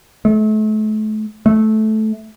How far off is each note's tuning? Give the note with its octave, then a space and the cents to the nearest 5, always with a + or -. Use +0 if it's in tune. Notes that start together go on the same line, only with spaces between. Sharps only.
A3 -35
A3 -15